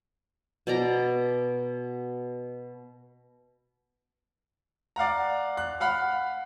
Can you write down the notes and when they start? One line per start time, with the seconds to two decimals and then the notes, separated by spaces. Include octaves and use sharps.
0.67 B2 D5 A#5
4.96 D5 F5 F#5 A#5
5.57 F#6
5.80 F5 F#5 B5 F6